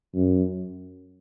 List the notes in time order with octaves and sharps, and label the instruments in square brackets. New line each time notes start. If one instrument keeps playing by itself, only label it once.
[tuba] F#2